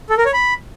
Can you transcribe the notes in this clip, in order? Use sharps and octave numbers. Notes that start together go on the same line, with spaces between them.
A4
A#4
C#5
B5